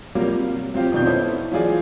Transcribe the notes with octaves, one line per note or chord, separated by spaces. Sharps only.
C3 F#3 G3 A#3 F4
C3
F#3 C4 F4 G4
F2 B2 D#3 D5 G6
B3 C#4 E4 A4 C5
E3 F#3 F4 G#4 D5